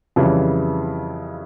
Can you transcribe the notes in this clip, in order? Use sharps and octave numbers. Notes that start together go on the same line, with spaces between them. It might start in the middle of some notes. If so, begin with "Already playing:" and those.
F2 C#3 E3 G3